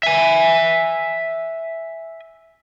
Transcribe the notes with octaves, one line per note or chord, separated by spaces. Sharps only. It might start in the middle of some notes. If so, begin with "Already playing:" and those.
E5 G#5